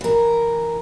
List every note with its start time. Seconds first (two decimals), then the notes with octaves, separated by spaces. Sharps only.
0.01 E3 A#4